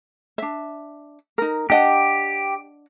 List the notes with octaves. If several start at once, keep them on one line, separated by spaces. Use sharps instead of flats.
D4 E5
D#4 A#4
D4 G4 D#5 F#5